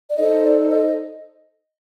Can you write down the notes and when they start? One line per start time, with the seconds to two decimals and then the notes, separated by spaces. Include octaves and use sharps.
0.10 D5
0.17 D#4 A4 C5 D#5
0.43 D5
0.70 D#5